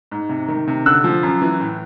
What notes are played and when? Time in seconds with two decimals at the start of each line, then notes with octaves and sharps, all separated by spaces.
0.12 G#2
0.29 C3
0.48 D#3
0.68 C3
0.86 D3 E6 F#6
1.04 F3
1.23 F#2
1.42 E3
1.60 A2